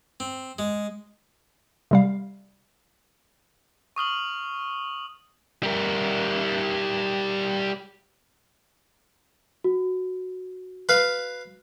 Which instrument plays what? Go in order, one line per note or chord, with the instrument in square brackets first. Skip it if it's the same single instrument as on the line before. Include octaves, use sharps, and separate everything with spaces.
[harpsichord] C4
G#3
[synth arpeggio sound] C3 G3 F5
[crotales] C#6 D#6 F6 F#7
[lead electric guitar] G3 A#4
[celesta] F#4
[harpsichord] B4 F5